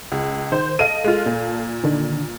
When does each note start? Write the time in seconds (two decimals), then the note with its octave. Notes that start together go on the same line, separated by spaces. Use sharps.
0.12 C#2
0.52 D#3 C5
0.79 A4 D#5 F5 D#7
1.04 G#3 F4
1.26 A#2
1.84 D3 D#3 D4